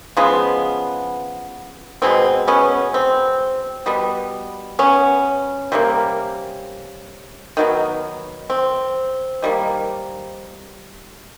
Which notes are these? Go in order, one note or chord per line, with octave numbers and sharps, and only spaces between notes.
C#3 F3 G#3 B3
B2 G#3 B3 C4
B3 C#4
C4
B2 G3 B3
B3 C#4
C3 E3 G3 A#3
D#3 F#3 B3
C4
D#3 G3 A#3